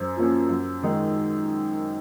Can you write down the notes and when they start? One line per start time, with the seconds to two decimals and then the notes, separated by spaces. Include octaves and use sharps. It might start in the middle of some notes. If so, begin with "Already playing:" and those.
Already playing: F#2 C5
0.16 F3 A#3 C#4
0.48 F#2
0.83 D#3 G#3 D#4